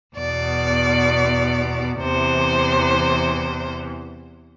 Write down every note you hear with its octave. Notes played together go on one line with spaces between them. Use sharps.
E2 B2 D5
E2 C3 E3 C5